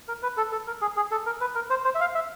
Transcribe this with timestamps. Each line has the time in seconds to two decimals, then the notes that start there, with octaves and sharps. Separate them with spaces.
0.08 A#4
0.23 B4
0.37 A4
0.52 A4
0.67 A#4
0.82 G#4
0.96 G#4
1.11 A4
1.26 A#4
1.41 B4
1.55 A#4
1.70 C5
1.85 C5
1.95 E5
2.01 F5
2.15 E5